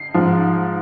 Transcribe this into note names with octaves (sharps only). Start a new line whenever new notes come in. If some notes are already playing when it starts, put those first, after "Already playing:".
Already playing: C7
G#2 F3